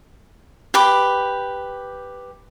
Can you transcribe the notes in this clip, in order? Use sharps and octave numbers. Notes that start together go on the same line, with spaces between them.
G4 B4 D6